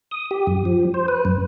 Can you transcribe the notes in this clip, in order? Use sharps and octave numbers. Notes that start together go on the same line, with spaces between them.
D#6
G4
F#2
F3
C5
B4
F#2